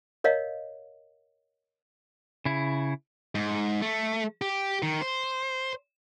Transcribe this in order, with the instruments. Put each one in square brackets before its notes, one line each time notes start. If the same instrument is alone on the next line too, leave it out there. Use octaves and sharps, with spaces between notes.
[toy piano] A#4 C#5 D#5 F5
[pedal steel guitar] C#3 E4
[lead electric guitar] G#2
A3
G4
D#3
C5